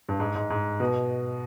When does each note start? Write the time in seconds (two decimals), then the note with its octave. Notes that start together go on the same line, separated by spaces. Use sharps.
0.09 G2
0.20 G#2
0.35 G#2
0.50 G#2
0.80 B2